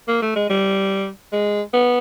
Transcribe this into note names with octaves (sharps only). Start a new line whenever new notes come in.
A#3
A3
G#3
G3
G#3
B3